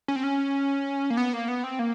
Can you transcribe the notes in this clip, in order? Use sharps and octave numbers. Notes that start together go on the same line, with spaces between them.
C#4
C4
C#4
A#3
B3
A#3
B3
C4
A#3